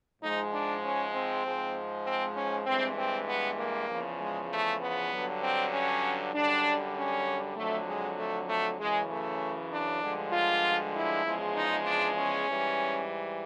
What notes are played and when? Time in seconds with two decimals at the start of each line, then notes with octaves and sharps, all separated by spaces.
0.21 G#2 F3 G#3 D#4
0.52 D4
0.83 C#4
1.13 C4
1.44 G#2 F3 G#3
2.05 C4
2.36 C#4
2.66 G2 E3 G#3 C4
2.98 C4
3.28 B3
3.59 A#3
3.89 E2 C#3 F3
4.20 G#3
4.51 A3
4.81 B3
5.12 G2 D3 F#3
5.43 C4
5.73 C#4
6.34 F#2 D3 G3 D4
6.96 C#4
7.57 F2 D3 F#3 A3
7.88 G#3
8.18 A3
8.49 A3
8.80 F#2 C#3 E3 G#3
9.11 A3
9.72 D4
10.02 G2 D3 F3 G#3
10.33 F4
10.94 E4
11.25 E2 C#3 F3 G#3
11.56 D#4
11.86 D4
12.17 C#4
12.48 G#2 E3 G3